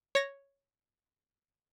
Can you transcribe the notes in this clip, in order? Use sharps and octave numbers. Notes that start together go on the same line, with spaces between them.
C#5 A#6